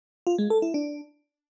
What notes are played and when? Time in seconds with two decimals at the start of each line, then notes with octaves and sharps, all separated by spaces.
0.27 F4
0.38 G#3
0.50 A4
0.62 E4
0.74 D4